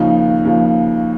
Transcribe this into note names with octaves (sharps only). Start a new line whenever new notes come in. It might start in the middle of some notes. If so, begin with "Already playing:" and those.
Already playing: D#2 C#3 F3 D#4
D#2 C#3 F3